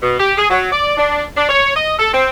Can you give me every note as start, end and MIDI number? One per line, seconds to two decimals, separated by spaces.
0.01 0.16 47
0.19 0.33 67
0.38 0.47 68
0.50 0.68 54
0.72 0.96 74
0.97 1.24 62
1.37 1.46 62
1.49 1.71 73
1.75 1.95 75
1.99 2.09 69
2.14 2.29 60